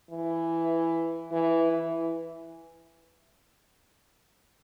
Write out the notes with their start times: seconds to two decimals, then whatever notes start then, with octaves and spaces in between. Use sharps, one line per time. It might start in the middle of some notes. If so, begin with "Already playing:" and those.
0.10 E3
1.31 E3
1.71 E3